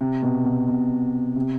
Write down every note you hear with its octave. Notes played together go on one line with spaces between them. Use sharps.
C3
B2
B2
B2
C3